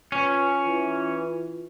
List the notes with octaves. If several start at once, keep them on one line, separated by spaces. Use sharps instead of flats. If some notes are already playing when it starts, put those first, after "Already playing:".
C#4 F4 B4
E3